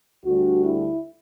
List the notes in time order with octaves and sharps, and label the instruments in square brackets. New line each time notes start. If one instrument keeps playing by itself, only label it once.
[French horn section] D2 D3 G3 F#4
E4